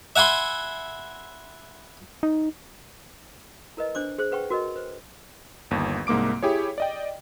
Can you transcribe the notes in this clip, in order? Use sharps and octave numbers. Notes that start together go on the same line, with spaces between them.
E5 F#5 G#5 B5 C6
D#4
E4 A#4 B4 D#5
D4 C5 D6
G#4 C5
G#4 B4 F#5 G5 C#6
F#4 A#4 B4 D#5
B4 C5
G1 D#2
C2 G#2 A#3 D6 D7
E4 G4 G#4 C#5
D5 D#5 G5